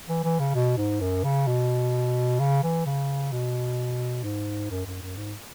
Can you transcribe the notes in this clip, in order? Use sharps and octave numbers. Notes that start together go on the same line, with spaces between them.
E3
E3
C#3
B2
G#2
F#2
C#3
B2
C#3
E3
C#3
B2
G#2
F#2
F#2
F#2
G#2